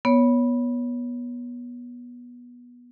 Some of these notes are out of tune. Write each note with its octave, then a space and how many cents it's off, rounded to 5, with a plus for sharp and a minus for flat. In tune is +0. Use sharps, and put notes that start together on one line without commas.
B3 -20 C#5 +10